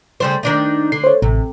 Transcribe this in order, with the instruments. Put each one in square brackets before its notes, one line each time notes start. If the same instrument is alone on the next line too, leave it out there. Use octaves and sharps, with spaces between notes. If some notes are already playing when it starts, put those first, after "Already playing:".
[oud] C#3 G3 C5
D#3 D4 D#4
[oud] D3 [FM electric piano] C7
[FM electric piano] C5 C#5
[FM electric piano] A1 [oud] C3